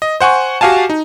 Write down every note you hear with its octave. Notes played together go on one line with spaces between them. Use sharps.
D#5
C5 F#5 G#5 C#6
F#4 G4 F5 G#5 A5
D#4